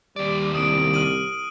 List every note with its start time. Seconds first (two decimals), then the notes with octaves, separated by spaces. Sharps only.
0.16 D#2 G3 D5
0.55 C2 D#6 D7
0.94 F6 D#7 F#7